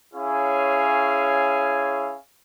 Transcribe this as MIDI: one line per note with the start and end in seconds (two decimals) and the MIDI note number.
0.14 2.16 61
0.14 2.16 64
0.14 2.16 68
0.14 2.16 73
0.14 2.16 77
0.14 2.16 80